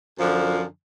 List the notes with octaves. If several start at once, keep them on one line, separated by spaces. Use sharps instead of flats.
F#2 D3 F3